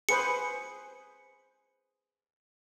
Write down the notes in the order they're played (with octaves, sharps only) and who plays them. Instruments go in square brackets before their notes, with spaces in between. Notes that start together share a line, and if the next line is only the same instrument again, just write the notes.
[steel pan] G#4 B4 C5 [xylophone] C#7